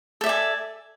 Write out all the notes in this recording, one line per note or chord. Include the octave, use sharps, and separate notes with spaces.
A4 D5 E5 G#5